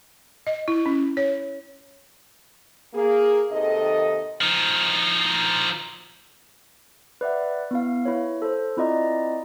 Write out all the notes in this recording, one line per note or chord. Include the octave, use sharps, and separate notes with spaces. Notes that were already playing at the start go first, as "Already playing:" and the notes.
D#5
E4
C#4
C#5
A#3 G#4
D#2 C3 D#3 A4 D#5
F3 D#4
B4 D5 E5 F#5
B3 E4 F5
E4 B4 C#5
A4 C5
C4 E4 F4 D5 D#5 A#5